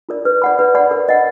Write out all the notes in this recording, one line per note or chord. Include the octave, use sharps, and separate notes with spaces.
F4 A#4 D5
B4
D5 F#5 B5
B4
D5 F#5 B5
A#4
D#5 F#5